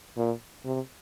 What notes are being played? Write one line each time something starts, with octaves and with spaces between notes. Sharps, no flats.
A#2
C3